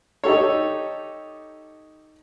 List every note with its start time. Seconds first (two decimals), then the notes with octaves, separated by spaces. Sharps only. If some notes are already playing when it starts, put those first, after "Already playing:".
0.24 D#4 G4 A4 C#5